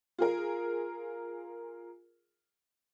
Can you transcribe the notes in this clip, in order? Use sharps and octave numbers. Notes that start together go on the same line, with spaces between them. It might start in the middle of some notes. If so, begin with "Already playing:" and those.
F4 G#4 A#4